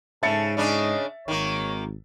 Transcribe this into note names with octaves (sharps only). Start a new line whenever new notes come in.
G#2 C#3 A4 E5 A6 C#7
C#3 C#4 D4 D#5
G#1 D#3 A#3 C#5